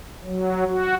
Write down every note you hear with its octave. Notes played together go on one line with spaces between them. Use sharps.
F#3
F#4